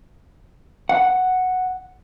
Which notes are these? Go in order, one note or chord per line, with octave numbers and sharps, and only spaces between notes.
F#5